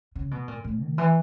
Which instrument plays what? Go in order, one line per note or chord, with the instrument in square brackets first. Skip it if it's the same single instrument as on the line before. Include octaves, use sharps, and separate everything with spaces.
[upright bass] C#3
B2
A#2
A2
D#3
E3